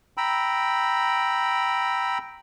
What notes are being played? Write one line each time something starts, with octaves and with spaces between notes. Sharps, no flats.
G5 A#5 B5 E6